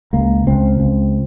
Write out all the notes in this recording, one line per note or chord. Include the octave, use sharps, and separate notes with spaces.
C#2 A#3
C#2 C4
C#2